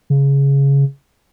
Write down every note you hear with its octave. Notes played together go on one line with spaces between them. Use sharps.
C#3